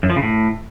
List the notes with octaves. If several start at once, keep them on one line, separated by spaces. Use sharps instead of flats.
F#2
F3
C#3
A2